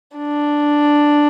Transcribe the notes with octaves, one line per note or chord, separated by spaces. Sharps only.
D4